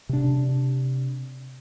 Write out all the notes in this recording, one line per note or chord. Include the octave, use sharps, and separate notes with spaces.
C3 D4